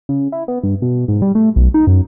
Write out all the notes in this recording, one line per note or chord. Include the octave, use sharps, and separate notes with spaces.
C#3
E4
B3
G2
B2
G#2
G3
A3
B1
D#4
F#2